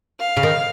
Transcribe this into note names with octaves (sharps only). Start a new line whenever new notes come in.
F5
C#3
D#3